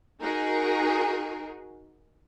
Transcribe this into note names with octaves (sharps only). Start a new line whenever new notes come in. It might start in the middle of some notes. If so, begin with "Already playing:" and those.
D#4 F#4 G#4 A#4